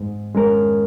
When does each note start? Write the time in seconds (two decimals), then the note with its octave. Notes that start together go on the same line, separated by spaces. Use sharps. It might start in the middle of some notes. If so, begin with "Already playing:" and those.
Already playing: G#2
0.35 G#3 C#4 A#4